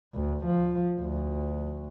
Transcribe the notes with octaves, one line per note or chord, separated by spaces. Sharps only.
D2
F3
D2